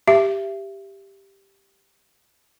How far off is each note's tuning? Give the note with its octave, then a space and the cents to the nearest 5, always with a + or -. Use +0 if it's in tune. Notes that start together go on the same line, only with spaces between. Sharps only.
G4 +0 E5 +25